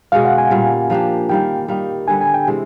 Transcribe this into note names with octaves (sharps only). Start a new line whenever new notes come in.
B2 G#3 C#4 F#4 F5
F#5
G#5
A#2 G3 A#3
F3 A#3 D4 G4
D#3 G3 A#3 G5
G3 A#3 D#4
D3 G3 B3 G#5
G#5
G5
C3 E3 G#3 C4